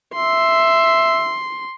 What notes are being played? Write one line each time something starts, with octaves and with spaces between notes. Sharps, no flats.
E5 C6